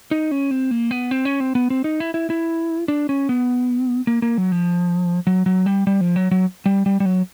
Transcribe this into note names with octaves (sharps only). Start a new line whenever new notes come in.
D#4
C#4
C4
A#3
B3
C4
C#4
C4
B3
C4
D#4
E4
E4
E4
D4
C#4
B3
A#3
A#3
F#3
F3
F#3
F#3
G3
G3
F3
F#3
F#3
G3
G3
G3
F#3